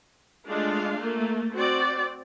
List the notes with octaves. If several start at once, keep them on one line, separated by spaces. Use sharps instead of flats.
G#3 A3 D4 F4 F5
A3 A#3
C4 F#4 C5 D5